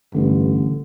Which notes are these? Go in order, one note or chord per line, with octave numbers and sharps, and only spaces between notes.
A1 G2 D3